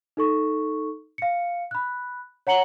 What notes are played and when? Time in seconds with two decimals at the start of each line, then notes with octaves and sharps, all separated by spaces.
0.17 D#4 A4 C#6
1.18 F5 C#7
1.71 B5 F#6
2.47 C#5 F#5 A#5 C#7 F#7 G7